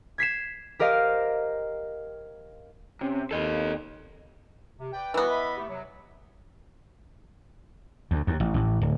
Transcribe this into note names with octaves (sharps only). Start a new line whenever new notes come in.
G#6 B6 C7 E7
G4 A#4 C5 D#5 F5
C3 C#4
D#2 A4 D#5
C3
B4 D5 G5
E3 G3 B3 E4 F#4
D#5 E5 B5
A3 G4
C3 F#3
D2
D#2
A1
A1
D1